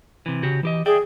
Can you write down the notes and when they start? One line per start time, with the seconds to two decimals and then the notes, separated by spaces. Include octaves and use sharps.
0.26 C3 E3
0.43 C#3 F#4 G4
0.63 E3 G4 D#5
0.86 G#4 D5 E5 G5